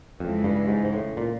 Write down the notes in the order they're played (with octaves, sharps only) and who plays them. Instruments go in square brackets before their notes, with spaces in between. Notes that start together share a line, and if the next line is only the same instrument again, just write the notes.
[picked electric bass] F2 [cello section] C#3 E3 G#3
[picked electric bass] G2
G#2
G#2
A2
A#2